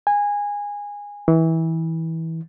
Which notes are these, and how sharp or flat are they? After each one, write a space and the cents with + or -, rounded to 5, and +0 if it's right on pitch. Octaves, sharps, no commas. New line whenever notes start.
G#5 -20
E3 -20